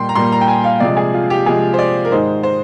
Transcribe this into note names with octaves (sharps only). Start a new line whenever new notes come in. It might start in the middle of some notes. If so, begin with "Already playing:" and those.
Already playing: A#2 G3 A#3 G5 C6
A#5
A#2 G3 A#3 C6
A#5
G5
G#5
F5
C3 F3 G#3 D5
G#4
F4
G4
C3 F3 G#3 G#4
C5
D5
A#4
G#2 D#3 G#3 C5
C5